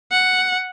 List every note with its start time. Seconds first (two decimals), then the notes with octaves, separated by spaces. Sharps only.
0.11 F#5